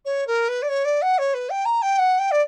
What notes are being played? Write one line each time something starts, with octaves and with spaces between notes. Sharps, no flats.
C#5
A#4
B4
D5
C#5
D5
F#5
C#5
B4
G5
A#5
G5
F#5
G5
D5